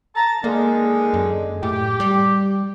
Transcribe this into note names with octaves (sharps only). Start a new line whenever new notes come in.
A5 A#5
D3 D#3 G#3 A#3
F#2
A2 G4
G3